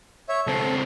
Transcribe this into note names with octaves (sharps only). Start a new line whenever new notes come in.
C#5 E5
C#2 C4 A4